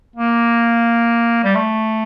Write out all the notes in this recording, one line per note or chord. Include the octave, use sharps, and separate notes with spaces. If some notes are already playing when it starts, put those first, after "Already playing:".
A#3
G3
A3